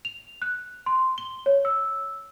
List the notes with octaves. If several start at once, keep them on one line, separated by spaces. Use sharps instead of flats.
F7
F#6
C6
G7
C#5
E6